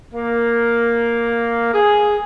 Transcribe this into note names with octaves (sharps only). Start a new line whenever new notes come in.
A#3
G#4